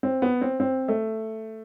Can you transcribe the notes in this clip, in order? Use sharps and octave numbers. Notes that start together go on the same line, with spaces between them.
C4
B3
C4
C4
A3